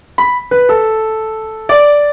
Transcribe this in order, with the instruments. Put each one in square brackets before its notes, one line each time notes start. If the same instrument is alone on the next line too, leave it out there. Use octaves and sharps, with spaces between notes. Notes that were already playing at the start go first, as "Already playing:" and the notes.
[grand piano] B5
B4
A4
D5